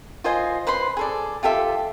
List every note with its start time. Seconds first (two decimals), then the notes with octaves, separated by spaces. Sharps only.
0.24 F4 C5 D#5 G#5
0.67 B4 C5 B5 C6
0.97 G#4 A4 D5
1.43 F4 G4 A4 E5